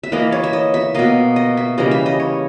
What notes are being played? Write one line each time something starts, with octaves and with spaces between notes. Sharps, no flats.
E5
E3 A#3 D#5
C#5
E5
D#5
E5
B2 A#3 D#5
D#5
E5
C#3 E3 G3 A#3 D#5
E5
D#5
C#5